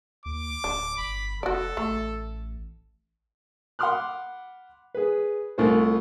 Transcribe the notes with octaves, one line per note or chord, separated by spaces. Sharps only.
D#2 D6
D1 D4
G1 B5
F1 F#4 A4 D5
A1 A3
F#5 B5 C6 D6 F6 F#6
G#4 B4
C2 A3 F4 C5